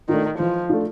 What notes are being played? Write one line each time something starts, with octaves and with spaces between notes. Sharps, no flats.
D#3 A3 D4 F4
E3 F3
A3 D4 F4